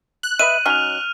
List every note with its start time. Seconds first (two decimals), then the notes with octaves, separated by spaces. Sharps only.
0.23 F#6
0.39 B4 D#5 E5 D#7
0.66 F#3 C#4 D#4 F6 F7